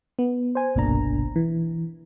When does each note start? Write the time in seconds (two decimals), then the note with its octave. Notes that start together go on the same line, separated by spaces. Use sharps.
0.19 B3
0.55 C5 G#5
0.75 G1 C2 B2 A#3 D4 A#5
1.36 E3